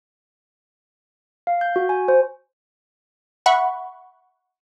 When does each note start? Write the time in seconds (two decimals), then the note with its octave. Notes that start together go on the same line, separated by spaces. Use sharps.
1.47 F5
1.61 G6
1.76 F#4
1.89 G#5
2.08 C5
3.46 E5 F#5 B5 C#6